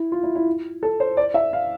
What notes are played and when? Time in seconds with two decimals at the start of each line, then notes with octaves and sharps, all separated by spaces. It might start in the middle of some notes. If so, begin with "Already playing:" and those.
Already playing: E4
0.12 F4
0.23 E4
0.35 E4
0.83 A4
1.00 C5
1.17 D5
1.34 E5
1.53 F5